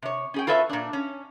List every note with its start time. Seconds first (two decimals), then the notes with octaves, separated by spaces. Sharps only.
0.02 C3 C#5
0.34 C#4 G#4 G5
0.47 F4 A4 B4 C#5 E5
0.69 A#2 D4
0.93 C#4